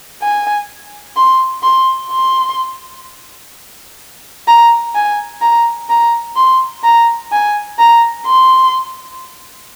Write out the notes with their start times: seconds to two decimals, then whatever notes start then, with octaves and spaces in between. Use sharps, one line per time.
0.22 G#5
1.17 C6
1.63 C6
2.11 C6
4.48 A#5
4.95 G#5
5.41 A#5
5.90 A#5
6.36 C6
6.83 A#5
7.32 G#5
7.79 A#5
8.26 C6